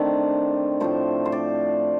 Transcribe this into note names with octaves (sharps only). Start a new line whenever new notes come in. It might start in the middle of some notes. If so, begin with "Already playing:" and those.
Already playing: D#3 A3 C4 D4
A2 F3 A3 C5
C5
D5